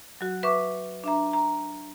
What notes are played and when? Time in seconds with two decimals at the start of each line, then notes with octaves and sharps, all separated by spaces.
0.21 F#3 F#4
0.43 B4 E5 C#6 D6
1.04 D4 E5 A#5
1.33 A#5